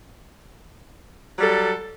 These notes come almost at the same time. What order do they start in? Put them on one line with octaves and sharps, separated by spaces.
F#3 G3 A4